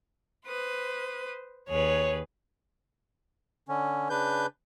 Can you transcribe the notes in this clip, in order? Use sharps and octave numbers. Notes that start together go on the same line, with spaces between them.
B4 C5 D#6
D#2 G#4 B4 C#5
D3 C#4
C#3 D4 B4 G6